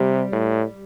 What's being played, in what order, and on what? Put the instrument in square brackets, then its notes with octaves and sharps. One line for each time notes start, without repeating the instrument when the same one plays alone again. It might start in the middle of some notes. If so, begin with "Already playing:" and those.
Already playing: [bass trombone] C3 [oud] G3
[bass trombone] A2